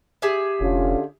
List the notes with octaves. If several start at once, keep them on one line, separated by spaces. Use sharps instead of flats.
G4 G#4 E5
F1 D3 C#4 F4